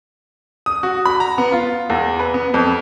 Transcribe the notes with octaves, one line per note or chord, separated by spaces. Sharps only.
D#6
F#4
B5
A#5
B3
F4
E2
B4
B3
F2